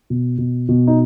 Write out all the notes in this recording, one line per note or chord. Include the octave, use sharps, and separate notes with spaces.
B2
B2
B2
D#4